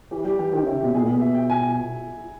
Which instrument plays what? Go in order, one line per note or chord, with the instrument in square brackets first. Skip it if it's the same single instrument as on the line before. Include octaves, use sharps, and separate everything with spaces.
[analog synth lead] E3 [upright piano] G4
[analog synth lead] G3 [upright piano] G4
[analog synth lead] E3 [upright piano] G4
[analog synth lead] D#3 [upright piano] G4
[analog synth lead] C#3 [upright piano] E4
[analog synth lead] B2 [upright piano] G4
[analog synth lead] B2 [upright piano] G#4
[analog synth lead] A#2
[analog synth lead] B2 [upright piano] G#4
[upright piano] E5
G5
G#5